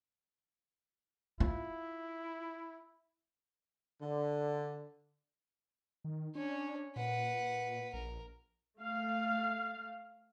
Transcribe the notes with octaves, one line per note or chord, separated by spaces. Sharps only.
E4 F4
D3
D#3
C#4 D4 C#5
A#2 B4 F#5
A#1 A#4
A3 F5